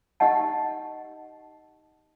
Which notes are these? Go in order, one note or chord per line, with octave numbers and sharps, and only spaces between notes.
D#4 G4 D#5 F#5 A5